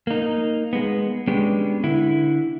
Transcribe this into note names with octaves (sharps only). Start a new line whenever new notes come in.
A#3 D#4
G#3 B3
G#3 B3 C#4 D4 G4
D3 E4